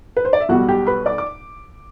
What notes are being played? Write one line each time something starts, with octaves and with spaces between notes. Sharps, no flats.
B4
C5
D5
E5
B1 B2 G3 F#4 F#5
G4 G5
B4 B5
D5 D6
D6